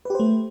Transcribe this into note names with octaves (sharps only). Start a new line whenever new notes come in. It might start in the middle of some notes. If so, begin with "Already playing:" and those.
A3 G4 B4 C5